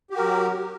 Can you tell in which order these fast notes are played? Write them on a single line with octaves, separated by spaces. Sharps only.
G4 F#4 A#4 F#3